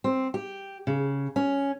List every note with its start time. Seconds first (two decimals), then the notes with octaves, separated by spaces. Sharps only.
0.04 C4
0.34 G4
0.87 C#3
1.36 C#4